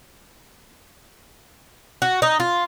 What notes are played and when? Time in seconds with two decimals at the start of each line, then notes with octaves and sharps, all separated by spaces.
2.02 F#4
2.22 D#4
2.40 F4